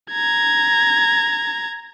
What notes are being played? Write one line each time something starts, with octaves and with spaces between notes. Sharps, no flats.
A#5 G#6